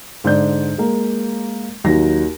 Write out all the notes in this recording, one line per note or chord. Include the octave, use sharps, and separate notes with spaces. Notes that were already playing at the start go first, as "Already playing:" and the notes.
G#2 D3 D5 G6
G#3 A#3
D#2 F#3 D#4 A#6